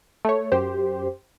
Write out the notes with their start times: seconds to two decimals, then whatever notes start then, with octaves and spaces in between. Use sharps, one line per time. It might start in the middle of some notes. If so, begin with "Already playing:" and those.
0.25 A3 C#5
0.52 F#2 G4 C5